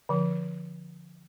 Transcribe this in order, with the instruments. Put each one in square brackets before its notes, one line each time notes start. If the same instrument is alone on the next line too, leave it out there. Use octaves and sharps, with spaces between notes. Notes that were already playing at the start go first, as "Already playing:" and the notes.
[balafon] D3 F3